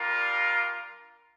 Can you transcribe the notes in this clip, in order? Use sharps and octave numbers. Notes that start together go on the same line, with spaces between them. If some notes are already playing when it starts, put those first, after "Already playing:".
Already playing: G3 D4 F4 A#4